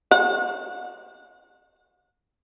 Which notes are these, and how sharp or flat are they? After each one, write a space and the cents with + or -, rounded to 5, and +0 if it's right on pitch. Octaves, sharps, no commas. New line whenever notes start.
F#5 -45